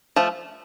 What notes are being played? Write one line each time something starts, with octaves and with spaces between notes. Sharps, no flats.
F3 A3